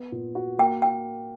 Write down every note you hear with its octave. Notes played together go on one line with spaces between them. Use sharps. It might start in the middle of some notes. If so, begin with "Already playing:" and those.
Already playing: B3
A#2
F#4
A#3 G5
G5